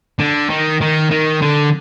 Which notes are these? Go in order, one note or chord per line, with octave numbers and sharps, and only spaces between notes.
D3
D#3
D#3
D#3
D3